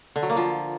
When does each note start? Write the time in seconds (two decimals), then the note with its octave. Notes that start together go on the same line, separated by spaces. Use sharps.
0.16 D3
0.23 F#3
0.30 A#3
0.37 F3